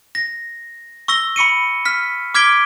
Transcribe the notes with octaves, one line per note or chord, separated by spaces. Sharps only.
A#6
C#6 E6 A#6 G7
B5 C#6 C#7 D#7
F6 B6
D6 F6 G#6 B6 D7 G7